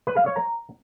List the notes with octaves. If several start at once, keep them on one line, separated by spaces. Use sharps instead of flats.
B4
F5
C#5
A#5